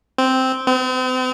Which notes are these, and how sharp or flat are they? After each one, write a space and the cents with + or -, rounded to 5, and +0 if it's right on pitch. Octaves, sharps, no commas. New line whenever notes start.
C4 -5
C4 -40